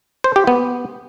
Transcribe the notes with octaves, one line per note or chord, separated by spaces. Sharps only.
C5
G4
B3